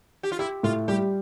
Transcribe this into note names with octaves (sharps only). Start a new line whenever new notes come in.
G4
F4
E4 G4
A2 F4
G3 G4